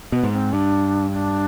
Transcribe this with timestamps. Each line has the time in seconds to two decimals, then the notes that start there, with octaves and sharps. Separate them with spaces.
0.12 B2 B3
0.23 G#2
0.32 C4
0.53 G2 D4
1.13 D4